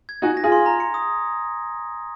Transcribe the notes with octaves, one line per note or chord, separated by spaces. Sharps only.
G#6
D#4 F#4 G#5
A#6
F4 G#4
C6
A#5
C#7
D#6